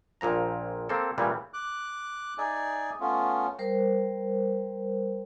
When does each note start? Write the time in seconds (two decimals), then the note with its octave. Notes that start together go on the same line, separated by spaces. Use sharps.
0.21 A#1 A#2 F3 A#5
0.89 A#3 C4 A4
1.18 A#2 C#3 E3 G3
1.54 D6 F#6
2.38 D#4 G#4 D5 E5 G#5
3.00 A3 B3 C#4 F4
3.59 G3 A#4 C5